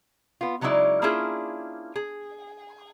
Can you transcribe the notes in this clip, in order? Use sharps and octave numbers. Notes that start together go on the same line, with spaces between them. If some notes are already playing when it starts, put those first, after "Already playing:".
B3 F4
C#3 F#3 G#3 D#4 E4 D5
A#3 C#4 D4 E4 F4 G#4
G#4